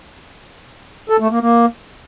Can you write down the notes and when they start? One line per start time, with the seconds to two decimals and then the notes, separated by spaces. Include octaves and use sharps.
1.10 A4
1.20 A3
1.30 A#3
1.41 A#3